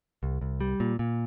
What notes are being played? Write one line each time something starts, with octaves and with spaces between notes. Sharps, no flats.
C2
C2
G3
A#2
A#2